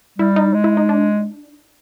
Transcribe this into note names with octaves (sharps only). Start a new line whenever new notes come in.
G3 E4
D#4
G#3
E4
D#4
D4